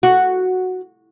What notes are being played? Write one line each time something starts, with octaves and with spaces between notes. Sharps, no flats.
F#4